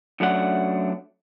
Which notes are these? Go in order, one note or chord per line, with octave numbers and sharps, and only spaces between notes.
F#2 F#3 A3 D4 G4 F#5